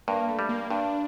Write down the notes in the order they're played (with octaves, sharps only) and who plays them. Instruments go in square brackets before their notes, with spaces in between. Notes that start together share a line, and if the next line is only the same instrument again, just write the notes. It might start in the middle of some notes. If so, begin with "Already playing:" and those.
[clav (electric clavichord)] G2 [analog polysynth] A#3
[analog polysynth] A3
[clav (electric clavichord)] G3
[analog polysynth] A#3
[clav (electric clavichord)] G2 [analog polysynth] D4